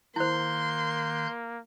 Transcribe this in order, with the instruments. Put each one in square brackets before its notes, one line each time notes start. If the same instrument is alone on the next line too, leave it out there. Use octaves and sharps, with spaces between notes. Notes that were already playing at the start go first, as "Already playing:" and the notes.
[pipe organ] D#3 F#6 G6 [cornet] A#3 [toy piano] E4 C5 [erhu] C6